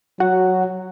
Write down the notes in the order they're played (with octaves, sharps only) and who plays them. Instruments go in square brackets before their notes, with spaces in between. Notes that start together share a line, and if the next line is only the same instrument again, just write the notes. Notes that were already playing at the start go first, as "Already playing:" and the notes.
[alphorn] F#3 [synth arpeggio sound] F#4 [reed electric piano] F#5